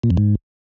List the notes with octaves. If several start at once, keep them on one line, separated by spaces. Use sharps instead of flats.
A#2
F2
G#2